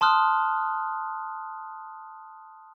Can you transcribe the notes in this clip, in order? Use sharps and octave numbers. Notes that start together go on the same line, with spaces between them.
A5 C6 D#6 F6 F#6